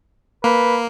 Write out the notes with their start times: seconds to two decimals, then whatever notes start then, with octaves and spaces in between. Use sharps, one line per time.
0.44 A#3 B4